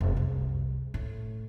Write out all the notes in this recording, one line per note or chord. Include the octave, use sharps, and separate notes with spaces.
F1
C2
A2